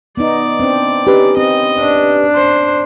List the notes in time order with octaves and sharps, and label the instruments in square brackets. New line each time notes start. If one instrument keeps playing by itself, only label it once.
[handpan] B3 D#4 [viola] D5
[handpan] C4 D4
[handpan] C#4 D#4 [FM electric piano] G4 B4
[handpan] C4 [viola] D#5
[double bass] D4
[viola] C5